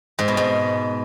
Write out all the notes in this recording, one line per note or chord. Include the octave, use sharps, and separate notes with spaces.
G#2
B2
G#2